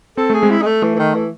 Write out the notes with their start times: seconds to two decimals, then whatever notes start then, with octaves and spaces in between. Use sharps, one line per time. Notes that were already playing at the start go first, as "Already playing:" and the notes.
0.17 C4 A4
0.30 A3 G#4
0.42 G#3 C4
0.50 E4
0.61 G#3
0.66 A3
0.82 E3 A3
0.95 E3
0.99 D#3
1.15 E3